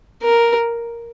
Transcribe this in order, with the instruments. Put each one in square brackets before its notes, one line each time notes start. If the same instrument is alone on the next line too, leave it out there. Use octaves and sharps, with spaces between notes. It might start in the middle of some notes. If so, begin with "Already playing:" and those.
[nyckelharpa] A#4